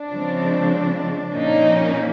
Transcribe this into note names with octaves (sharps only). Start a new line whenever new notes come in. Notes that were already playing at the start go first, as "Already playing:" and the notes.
Already playing: D4
C#3 F3 G#3 C4
A#2 F3 A#3 C#4 D#4